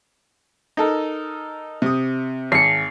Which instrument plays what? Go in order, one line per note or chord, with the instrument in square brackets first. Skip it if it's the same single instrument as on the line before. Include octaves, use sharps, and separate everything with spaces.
[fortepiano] D#4 A4 A#4
C3 D#6
[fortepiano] G#1 [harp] C7 C#7